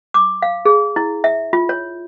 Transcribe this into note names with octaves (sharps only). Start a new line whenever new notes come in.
D6
F5
G#4
E4
E5
F4
C#5